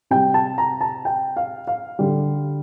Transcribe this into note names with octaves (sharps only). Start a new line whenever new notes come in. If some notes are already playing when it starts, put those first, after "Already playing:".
C3 G3 G5
A5
A#5
A5
G5
F5
F5
D3 G3